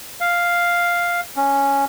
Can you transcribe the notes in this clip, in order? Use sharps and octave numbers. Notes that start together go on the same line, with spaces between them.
F5
C#4